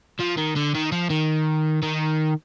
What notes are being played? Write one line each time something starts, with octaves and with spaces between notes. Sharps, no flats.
F3
D#3
D3
D#3
F3
D#3
D#3